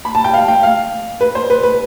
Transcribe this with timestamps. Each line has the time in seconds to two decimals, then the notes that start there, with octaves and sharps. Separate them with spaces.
0.05 B5
0.15 A5
0.24 G5
0.34 F5
0.48 G5
0.63 F5
1.21 B4
1.35 C5
1.50 B4
1.63 B4